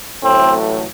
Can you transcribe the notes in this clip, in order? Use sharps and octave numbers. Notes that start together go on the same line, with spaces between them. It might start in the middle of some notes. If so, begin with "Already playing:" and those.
A1 A2 F#3 A3 C4